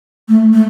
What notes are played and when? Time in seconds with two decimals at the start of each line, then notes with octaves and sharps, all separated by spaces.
0.29 A3
0.53 A3